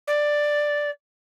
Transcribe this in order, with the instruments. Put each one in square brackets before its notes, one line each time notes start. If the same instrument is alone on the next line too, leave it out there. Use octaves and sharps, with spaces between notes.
[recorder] D5